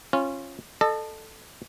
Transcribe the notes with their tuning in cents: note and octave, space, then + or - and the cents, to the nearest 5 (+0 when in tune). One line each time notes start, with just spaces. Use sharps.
C#4 -20 F4 -10
A4 +0 D#5 -40